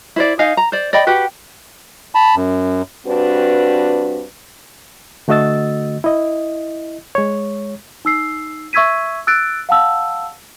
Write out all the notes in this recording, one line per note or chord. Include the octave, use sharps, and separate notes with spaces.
E4 C5 D5
D#4 D#5 F5 G#5
A#5
C5 D5
D5 D#5 G5 B5
F#4 G4 B4 F#5
A5 B5
F#2
G2 C4 D4 F#4 B4
D3 A3 F#4 D#5 E6 A6
E4 D#5
G#3 C#5
D#4 E6 C7
E5 C#6 E6 G#6 B6 D#7
E6 F#6 A6 D7
F5 F#5 A5 E6